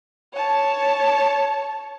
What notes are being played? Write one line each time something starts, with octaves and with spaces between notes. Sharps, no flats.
C#5 A5